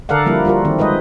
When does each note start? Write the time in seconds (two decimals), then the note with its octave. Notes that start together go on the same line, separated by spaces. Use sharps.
0.09 D3 A4 A#4 D5 F5 F#5
0.26 F3 G3 A#3 E4
0.45 G3 F4 F#4 A#4
0.65 D#3 C4
0.79 G#3 B4 C5 D#5